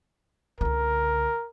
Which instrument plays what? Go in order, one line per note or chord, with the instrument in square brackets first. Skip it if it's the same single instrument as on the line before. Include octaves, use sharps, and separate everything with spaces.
[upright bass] C#2 D3 [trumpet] A#4